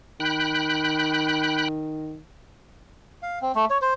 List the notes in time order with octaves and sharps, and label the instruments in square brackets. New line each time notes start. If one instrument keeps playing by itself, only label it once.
[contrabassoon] D#3 [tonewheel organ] G5 B5 F#6
[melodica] F5
C4
A3
C#5
C5